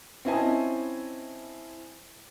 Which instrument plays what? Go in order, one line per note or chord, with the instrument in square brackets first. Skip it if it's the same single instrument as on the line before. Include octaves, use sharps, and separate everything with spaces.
[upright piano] C4 C#4 E4 D#5 G#5 A5